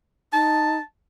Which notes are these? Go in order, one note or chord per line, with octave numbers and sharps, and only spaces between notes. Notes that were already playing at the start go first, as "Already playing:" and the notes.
D#4 A5